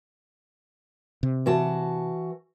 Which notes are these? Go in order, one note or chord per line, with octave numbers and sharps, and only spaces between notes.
C3
E3 F#4 A5